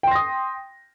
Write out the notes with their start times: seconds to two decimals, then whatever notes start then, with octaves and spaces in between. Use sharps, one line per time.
0.03 G5
0.07 C6
0.11 A#6
0.15 D#6